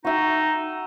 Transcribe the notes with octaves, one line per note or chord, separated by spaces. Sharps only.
D#4 F#4 E5 G5